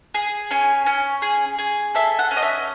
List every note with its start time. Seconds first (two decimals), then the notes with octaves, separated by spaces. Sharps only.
0.14 G#4
0.51 C#4 G#5
0.86 C#4
1.22 G#4
1.58 G#4
1.95 A4 E5
2.19 F#5
2.31 C#4
2.37 D#5
2.42 E5